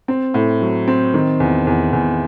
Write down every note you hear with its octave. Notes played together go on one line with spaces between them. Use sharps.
C4
A2
F#3
C4
D#3
E2
E2
E2